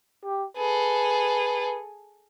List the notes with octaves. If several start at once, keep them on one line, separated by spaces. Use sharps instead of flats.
G4
G#4 A4 B4